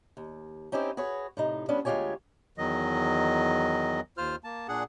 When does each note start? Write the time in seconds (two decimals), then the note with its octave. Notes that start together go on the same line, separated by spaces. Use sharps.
0.17 D#2
0.72 C4 C#4 D#4 E4 G4 C5
0.97 F#4 G#4 B4 C#5
1.37 A2 C3 D#4
1.68 G3 B3 C#4 D4
1.85 D2 G#3 F4 G4 C#5 G#5
2.58 E2 D#3 F#3 D#5
4.18 D#2 F4 C5 F6
4.44 A#3 A5
4.68 A#2 D4 G#4 F#5